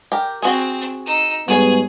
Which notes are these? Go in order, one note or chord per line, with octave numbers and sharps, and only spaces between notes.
G4 A#4
C4 F#4 G#4
D#4 E6
G#2 G3 B3 F#4 G#4 C#5